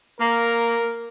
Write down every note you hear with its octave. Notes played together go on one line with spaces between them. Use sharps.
A#3 A#4